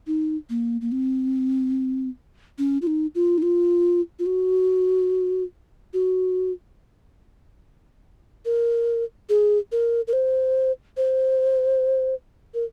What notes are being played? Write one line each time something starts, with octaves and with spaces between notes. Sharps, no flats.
D#4
A#3
A#3
C4
C#4
F4
D#4
F4
D#4
F4
F4
F#4
F#4
A#4
G#4
A#4
A#4
C5
C5
A#4